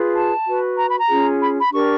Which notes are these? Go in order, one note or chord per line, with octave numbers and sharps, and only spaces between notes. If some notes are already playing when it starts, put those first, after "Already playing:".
Already playing: F4 G#4 B4
A5
F#4 B4
A#5
B5
A#5
C#4 F4 G#4
B5
B5
D4 G4 A#4 C#6